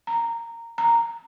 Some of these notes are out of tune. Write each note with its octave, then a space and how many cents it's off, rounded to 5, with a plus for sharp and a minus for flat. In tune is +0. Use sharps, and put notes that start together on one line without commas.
A#5 -10
A#5 -5